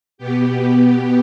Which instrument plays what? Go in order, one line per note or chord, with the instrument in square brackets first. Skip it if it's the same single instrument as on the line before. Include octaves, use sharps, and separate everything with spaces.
[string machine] B2 B3 G4